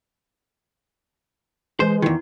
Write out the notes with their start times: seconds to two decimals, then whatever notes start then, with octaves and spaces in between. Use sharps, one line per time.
1.80 E3 G#3 B4 C5
2.02 E2 D#3 E4